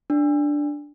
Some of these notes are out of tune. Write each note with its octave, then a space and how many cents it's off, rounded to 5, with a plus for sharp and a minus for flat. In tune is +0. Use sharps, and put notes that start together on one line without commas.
D4 +0